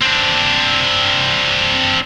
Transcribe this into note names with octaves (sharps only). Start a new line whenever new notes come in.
C4 D4